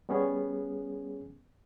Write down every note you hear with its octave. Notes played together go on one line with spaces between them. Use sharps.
G3 B3 C#4 G#4